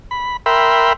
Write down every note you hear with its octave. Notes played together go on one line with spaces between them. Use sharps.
B5
A#4 E5 G5 B5 C6